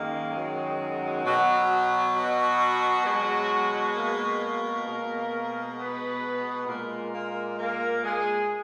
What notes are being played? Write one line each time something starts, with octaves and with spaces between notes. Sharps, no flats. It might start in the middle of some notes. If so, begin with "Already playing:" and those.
Already playing: F#2 D#3 G#3 A#3 A#4
F#3 F#4
B2 F#3
F#3 F#4
B2 G#3
A#3 A#4
B2 G#3
B3 B4
A#2 G#3 A#3 A#4
A#3 A#4
A#3 A#4
G#3 G#4